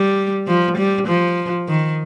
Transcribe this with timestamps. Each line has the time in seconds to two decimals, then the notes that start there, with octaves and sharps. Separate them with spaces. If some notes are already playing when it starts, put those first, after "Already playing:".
Already playing: G3
0.47 F3
0.78 G3
1.08 F3
1.68 D#3